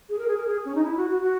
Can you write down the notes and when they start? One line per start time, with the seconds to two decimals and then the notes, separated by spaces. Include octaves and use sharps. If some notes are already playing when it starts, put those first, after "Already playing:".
0.09 G#4
0.18 A#4
0.28 G#4
0.37 A#4
0.47 G#4
0.65 C#4
0.75 D#4
0.84 E4
0.97 F#4
1.10 F#4
1.22 F#4